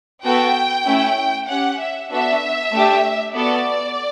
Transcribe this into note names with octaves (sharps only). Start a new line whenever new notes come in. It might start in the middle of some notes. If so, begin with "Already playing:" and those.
B3 F#4 A4 G5
A3 C#4 E4
C#4 G4 F#5
E5
B3 D4 F#4 A4 E5
A3 D4 G4
B3 F#4 A4 D5